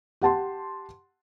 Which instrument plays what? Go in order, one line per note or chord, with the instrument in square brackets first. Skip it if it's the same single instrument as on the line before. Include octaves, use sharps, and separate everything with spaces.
[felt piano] G4 F#5 A5 C6